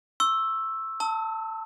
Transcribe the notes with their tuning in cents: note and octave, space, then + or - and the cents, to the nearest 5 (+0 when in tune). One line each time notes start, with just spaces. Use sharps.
C#6 -35 E6 +0
A5 +20 E6 -40